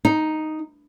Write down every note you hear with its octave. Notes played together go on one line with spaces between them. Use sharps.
D#4